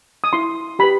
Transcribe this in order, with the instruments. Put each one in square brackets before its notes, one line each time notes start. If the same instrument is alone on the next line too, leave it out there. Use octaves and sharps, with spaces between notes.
[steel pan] D#6
E4 C6
G4 B4 B5